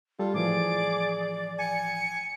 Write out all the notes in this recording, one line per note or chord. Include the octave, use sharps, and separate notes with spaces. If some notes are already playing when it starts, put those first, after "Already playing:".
G3 F4 A4
A2 E3 F3 G#4 D5 D6
G#5 C#7